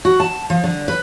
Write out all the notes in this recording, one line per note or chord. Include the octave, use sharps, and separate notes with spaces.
F#4
A5
F3
D3
B4